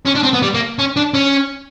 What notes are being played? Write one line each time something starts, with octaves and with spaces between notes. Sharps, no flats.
C#4
D4
C4
B3
G3
A#3
C#4
D4
C#4